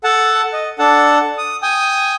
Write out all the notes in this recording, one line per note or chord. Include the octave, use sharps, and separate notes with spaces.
A4 F#5 A5
D#5
D4 A4 F#5 A5
D#6
G5 G#5 D#6